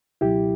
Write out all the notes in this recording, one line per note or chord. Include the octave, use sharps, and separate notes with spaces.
C#2 B2 F#3 E4 G4